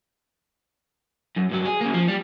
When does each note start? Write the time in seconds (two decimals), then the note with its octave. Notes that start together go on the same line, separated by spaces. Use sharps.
1.36 F#2
1.51 G2 F#3
1.65 G#4
1.81 C#3 A#3
1.94 F3
2.08 G3